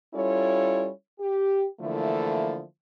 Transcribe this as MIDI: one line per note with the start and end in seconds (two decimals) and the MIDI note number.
0.14 0.89 55
0.14 0.89 61
0.14 0.89 64
0.14 0.89 65
0.14 0.89 69
0.14 0.89 73
1.20 1.65 67
1.81 2.62 50
1.81 2.62 52
1.81 2.62 53
1.81 2.62 57
1.81 2.62 58
1.81 2.62 64